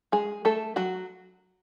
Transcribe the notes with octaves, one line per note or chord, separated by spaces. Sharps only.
G#3 G#4
A3 A4
F#3 F#4